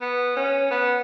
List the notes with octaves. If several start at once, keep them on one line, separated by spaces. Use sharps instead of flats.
B3
C#4
B3